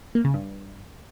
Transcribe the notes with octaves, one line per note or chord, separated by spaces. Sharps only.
A#3
C#3
G2